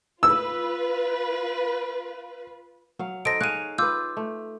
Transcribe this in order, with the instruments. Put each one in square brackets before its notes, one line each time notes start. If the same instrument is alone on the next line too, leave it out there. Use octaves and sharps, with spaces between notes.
[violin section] F4 B4 [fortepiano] E6
[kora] F#3 F5
[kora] D#4 A4 C5 [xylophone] A#6 D7
[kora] G#4 C#5 F5 [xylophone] F#6 D#7
[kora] F4 B4 [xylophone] D6 E6 G6
[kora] A3